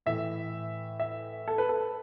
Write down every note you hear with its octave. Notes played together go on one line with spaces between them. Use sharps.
A2 E3 E5
E5
A4
B4
A4